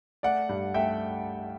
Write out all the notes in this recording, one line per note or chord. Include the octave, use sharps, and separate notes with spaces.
A3 D5 F#5
G2
A3 E5 G5